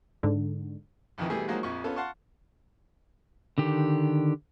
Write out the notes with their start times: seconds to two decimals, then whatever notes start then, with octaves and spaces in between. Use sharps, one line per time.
0.23 G#2 D3
1.18 A#1 F2 D#3 E3
1.30 B2 E3 G3 A3 G4 G#4
1.48 F3 F#3 G#3 A#3 D#4 F#4
1.63 A#1 F2 C#6
1.84 B3 C#4 F4 A4
1.96 F5 F#5 A5 C6 C#6
3.58 D3 D#3 G4